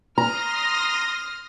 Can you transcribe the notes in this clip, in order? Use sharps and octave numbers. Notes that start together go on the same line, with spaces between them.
A#5 C6 D#6 F6 A#6